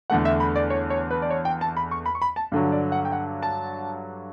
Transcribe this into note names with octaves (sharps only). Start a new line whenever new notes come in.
E2 D3 A3 F#5
E5
B5
D5
C#5
C#5
B4
D5
C#5
G5
A5
B5
C#6
B5
C#6
B5
A5
G2 D3 F#3
D5
F#5
G5
F#5
A5